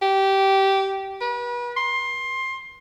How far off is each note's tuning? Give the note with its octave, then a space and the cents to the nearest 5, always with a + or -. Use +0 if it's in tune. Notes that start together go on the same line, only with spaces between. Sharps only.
G4 -15
B4 -35
C6 +20